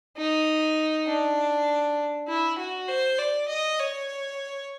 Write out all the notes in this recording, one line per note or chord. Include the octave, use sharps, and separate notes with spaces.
D#4
D4
E4
F#4
C5
D5
D#5
C#5